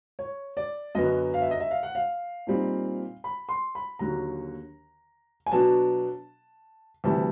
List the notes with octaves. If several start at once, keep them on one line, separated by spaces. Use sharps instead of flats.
C#5
D5
F#2 D3 F#3 B3 D#5
F5
E5
D#5
E5
F5
F#5
F5
A#2 G3 C4 D#4
B5
C6
B5
D#2 D3 F#3 A#5
G#5
B2 F#3 B3 D4 A5
D2 C3 E3 G3 A5